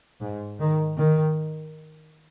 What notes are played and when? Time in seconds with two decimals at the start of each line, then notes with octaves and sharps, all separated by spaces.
0.21 G#2
0.60 D#3
0.98 D#3